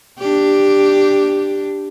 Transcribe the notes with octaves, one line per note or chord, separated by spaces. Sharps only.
D4 G4